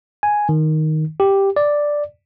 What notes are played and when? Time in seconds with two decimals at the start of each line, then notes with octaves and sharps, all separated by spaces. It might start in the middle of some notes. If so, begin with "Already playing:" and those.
0.23 G#5
0.49 D#3
1.20 G4
1.56 D5